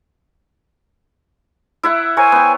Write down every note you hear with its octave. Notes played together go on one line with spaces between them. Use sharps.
E4 E5 F#5
A#4 C5 C#5 G#5
B3 G5